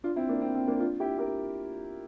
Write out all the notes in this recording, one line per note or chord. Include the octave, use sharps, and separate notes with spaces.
D4 F4
C4 E4
A#3 D4
C4
C4
A#3 D4
D4 F4
E4 G4
G4 A#4